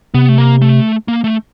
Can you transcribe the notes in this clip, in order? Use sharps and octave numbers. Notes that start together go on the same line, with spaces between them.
C3 B3
A3
A#3
A3
A#3
A3